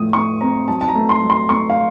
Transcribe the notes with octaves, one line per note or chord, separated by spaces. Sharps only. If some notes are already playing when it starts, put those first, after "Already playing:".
Already playing: A2 F3 A3 D#6
A3 C#6
C4 A#5
F#3 A5
A5
A#5
A3
C6
F#3
C6
A3 C#6
F5